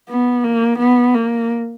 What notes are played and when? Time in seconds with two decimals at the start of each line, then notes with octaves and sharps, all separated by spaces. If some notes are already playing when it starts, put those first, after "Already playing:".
0.09 B3
0.44 A#3
0.79 B3
1.14 A#3